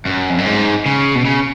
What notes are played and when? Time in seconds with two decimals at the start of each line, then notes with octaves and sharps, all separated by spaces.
0.06 F#2
0.31 F2
0.38 F#2
0.46 G#2
0.86 C#3
1.15 B2
1.25 C#3